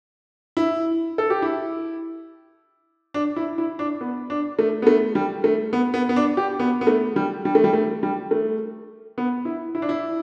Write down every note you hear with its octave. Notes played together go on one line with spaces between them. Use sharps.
E4
A4
G4
E4
D4
E4
E4
D4
B3
D4
A3
B3
A3
G3
A3
B3
B3
B3
D4
G4
B3
B3
A3
G3
G3
A3
G3
A3
G3
A3
B3
E4
E4
D4
E4